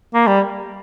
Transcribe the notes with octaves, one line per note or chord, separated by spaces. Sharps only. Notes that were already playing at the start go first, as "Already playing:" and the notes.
A#3
G3